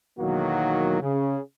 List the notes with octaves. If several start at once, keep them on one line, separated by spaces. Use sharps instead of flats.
B1 E2 D#3 F#3 A#3 F#4
C#3